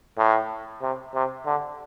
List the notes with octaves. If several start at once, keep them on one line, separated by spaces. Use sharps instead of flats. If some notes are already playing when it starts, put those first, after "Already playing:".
A2
C3
C3
D3